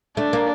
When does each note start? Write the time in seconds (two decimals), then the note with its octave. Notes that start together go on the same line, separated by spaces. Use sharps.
0.17 A3 D4
0.33 A#3